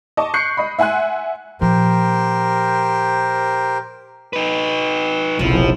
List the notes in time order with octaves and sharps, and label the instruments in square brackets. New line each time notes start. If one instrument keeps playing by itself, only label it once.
[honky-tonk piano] D#5 A5 C#6 D6
C#6 F#6 G6 C7 C#7
D#5 B5
E5 F#5 G#5 C6 F#6
[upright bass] A#2 F3 [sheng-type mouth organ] G4 A#4 C5
[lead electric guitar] D#4 B4
[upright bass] F1 C4 [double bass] B1 E4 [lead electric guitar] F3